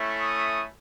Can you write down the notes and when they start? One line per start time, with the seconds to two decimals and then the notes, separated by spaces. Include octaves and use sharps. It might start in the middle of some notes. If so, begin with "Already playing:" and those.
Already playing: A3 C#4 E4
0.20 D#6